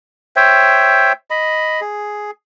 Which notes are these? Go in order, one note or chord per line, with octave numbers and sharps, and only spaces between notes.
C5 C#5 E5 G5
D#5 B5
G#4